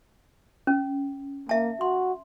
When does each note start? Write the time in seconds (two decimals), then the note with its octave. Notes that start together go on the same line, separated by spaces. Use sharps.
0.67 C#4
1.49 A#3 E5 A5
1.81 F#4 C6